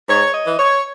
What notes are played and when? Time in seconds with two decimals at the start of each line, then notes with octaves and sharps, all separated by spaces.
0.08 G#2 C#5
0.34 D#5
0.46 E3
0.58 C#5